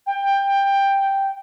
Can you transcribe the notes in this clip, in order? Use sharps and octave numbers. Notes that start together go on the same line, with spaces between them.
G5